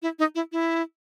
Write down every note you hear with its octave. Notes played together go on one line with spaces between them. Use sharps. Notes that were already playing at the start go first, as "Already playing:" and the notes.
E4
D#4
E4
E4